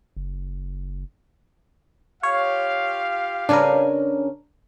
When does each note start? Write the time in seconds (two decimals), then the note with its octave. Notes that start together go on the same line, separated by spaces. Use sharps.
0.17 F#1
2.23 F4 G4 C#5 F5
3.49 C#3 C#4 D4 A#4 B4